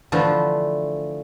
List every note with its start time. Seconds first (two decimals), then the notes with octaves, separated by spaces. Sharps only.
0.12 D3 E3 F3 A3 F4